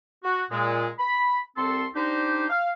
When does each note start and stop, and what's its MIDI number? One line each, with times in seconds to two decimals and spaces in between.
0.24 0.44 66
0.51 0.88 46
0.51 0.88 56
0.99 1.39 83
1.57 1.86 36
1.57 1.86 60
1.57 1.86 69
1.57 1.86 84
1.96 2.46 62
1.96 2.46 63
1.96 2.46 67
1.96 2.46 72
2.50 2.71 77